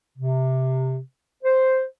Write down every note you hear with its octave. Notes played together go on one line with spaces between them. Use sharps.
C3
C5